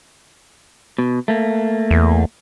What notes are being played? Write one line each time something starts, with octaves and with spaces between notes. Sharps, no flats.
B2
A3 A#3
E2